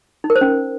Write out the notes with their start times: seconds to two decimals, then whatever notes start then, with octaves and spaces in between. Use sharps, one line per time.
0.24 D#4
0.30 A#4
0.36 C5
0.41 C#4